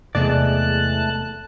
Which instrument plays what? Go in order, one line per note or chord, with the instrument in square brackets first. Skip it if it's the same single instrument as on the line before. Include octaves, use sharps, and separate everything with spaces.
[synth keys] E2 G#3 [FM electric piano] C3 [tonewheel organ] A3 A5 F#6 [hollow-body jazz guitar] D5